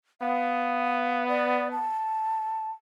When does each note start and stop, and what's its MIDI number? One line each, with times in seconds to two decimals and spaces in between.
0.21 1.88 59
0.21 1.26 77
1.28 1.69 74
1.71 2.71 81